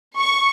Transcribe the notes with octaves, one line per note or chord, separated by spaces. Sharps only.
C#6